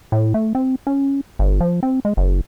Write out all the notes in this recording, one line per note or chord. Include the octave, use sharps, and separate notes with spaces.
A2
A3
C4
C#4
G1
F3
C4
G#3
F#1